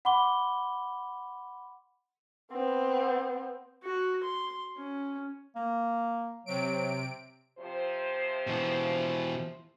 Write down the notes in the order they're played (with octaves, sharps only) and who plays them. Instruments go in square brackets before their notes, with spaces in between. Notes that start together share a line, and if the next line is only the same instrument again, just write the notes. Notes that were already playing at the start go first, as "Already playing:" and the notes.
[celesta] F#5 B5 C6 D6 G7
[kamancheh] B3 C4
[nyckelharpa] F#4
C6
C#4
[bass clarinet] A#3
[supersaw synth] C3 D7 [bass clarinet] F#3
[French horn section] C3 F3 C5
[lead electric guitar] B2 E3